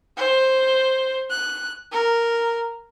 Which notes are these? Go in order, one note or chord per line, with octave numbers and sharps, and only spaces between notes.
C5
F#6
A#4